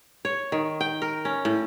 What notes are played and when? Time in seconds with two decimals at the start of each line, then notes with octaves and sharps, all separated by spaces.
0.25 C#5
0.52 D#3
0.81 G5
1.02 A#4
1.25 C#4
1.45 A2